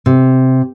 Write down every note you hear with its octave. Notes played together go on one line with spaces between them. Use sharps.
C3